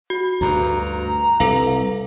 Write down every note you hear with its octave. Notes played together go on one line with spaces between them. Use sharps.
F#4
D2 G2 A#5
C2 A4 B4 F5